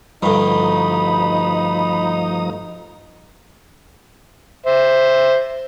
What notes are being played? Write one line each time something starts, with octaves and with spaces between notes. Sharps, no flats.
D2 G2 F3 D#4 A#5 B5 D#6
C5 E5